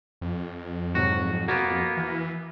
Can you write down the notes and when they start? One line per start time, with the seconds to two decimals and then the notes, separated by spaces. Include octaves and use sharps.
0.21 F2
0.95 G#2 C3 F#3 F#4
1.48 A#3 B3 F#4
1.97 E3